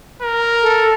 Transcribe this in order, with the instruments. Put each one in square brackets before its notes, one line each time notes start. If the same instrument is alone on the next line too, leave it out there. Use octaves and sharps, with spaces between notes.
[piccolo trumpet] A#4
[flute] A4